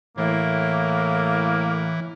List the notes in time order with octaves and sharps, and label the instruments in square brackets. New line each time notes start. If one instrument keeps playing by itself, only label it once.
[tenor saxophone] A2 [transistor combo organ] E3 [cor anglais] A#3